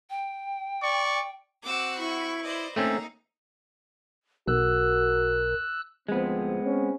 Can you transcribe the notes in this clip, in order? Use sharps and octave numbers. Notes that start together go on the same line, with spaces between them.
G5
D5 C#6
C4 F#4 F#5 D6 E6
E4 B5 C#6
B4 C5 D5 D#5
A3 A#3 C4 C#4 D#4 A#5 E6
B1 F#4 A#4 E6 F#6
D2 F3 G#3 B3 C4
C4 C#4